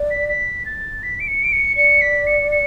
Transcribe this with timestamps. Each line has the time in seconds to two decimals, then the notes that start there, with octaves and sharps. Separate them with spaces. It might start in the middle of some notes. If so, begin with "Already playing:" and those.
Already playing: D5
0.10 B6
0.29 B6
0.65 A6
1.03 B6
1.20 D7
1.28 C#7
1.44 D7
1.52 C#7
1.77 D5 C#7
2.01 B6
2.27 C#7
2.51 C#7